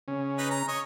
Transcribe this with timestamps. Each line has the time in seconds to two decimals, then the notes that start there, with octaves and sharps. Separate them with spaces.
0.08 C#3 C#4
0.38 D#4 B4
0.51 A#5
0.69 C#5 D#5